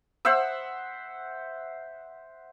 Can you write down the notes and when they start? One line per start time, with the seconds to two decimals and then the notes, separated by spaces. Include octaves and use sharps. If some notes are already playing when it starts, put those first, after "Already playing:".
0.25 C5 E5 F#5 E6